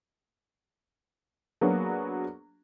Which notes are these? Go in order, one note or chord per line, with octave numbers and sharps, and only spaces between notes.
F#3 A#3 B3 D4 F#4 G#4